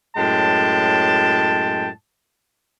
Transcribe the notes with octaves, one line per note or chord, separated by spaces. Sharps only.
F#2 A2 G#3 G5 A5